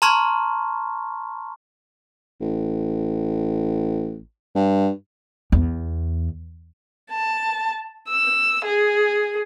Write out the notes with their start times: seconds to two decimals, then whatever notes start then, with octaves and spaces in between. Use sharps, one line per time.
0.02 A5 A#5 C6 C#6 F6 G#6
2.41 A1
4.55 G2
5.52 E2
7.12 A5
8.08 E6
8.64 G#4